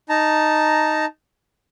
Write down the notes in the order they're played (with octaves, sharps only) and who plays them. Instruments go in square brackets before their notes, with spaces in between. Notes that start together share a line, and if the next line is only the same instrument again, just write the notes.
[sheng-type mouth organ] D#4 A5 A#5